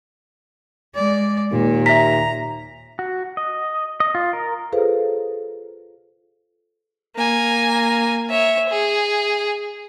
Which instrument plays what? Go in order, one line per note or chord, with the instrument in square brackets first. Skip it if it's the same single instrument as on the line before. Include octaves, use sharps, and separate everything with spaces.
[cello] G#3 D5
[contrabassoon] D#2 [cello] A#2
[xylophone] E5 B6 [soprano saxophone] A#5
[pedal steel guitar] F#4
D#5
D#5
F4
A#4
[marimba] F4 G#4 A4 B4 C5 F5
[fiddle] A#3 G#5
C#5 E5
G#4